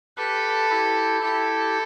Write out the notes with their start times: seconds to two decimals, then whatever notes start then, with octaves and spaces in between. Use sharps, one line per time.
0.17 G4 A4 B4
0.70 E4 G4
1.23 E4 G4 A4